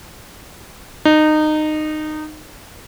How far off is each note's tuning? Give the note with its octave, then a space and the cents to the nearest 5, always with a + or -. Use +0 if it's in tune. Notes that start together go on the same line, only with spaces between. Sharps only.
D#4 -20